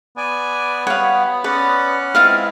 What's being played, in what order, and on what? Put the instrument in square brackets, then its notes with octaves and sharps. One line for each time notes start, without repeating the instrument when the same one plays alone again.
[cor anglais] B3 [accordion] D5 G#5
[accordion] G3 [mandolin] C#5 [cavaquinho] F5 F#5
[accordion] C#4 F#5 [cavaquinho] B4 D5
[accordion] G#3 B3 E4 [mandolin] C4 F4 F6 [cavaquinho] F5